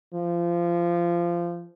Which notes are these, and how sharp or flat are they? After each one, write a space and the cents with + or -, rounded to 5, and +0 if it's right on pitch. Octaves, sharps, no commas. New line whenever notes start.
F3 -20